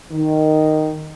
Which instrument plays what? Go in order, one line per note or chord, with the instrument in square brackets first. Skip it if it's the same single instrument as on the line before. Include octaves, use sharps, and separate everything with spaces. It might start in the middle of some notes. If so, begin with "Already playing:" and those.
[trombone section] D#3